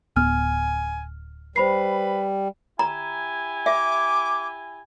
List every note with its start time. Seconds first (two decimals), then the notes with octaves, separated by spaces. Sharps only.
0.17 D1 B3 G#5 F6
1.56 G3 B4 C5 B5 C7
2.79 E4 G4 G#5 A#5
3.66 E5 D6